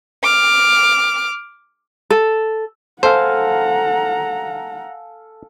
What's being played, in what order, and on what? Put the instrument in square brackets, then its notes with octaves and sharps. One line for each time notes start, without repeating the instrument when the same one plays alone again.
[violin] D6 F6
[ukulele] A4
[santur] A4 F5 G#5 [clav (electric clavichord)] C5 [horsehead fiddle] F#5 A#5